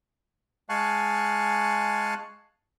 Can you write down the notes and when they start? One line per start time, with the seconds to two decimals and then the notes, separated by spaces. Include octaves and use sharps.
0.69 G#3 F5 G#5 A5 C#6 F#6